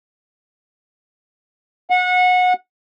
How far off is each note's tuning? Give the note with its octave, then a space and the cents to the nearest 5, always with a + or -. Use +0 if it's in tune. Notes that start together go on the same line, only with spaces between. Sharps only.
F#5 -25